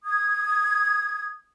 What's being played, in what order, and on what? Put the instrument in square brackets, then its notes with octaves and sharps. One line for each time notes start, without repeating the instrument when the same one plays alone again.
[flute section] D#6 G#6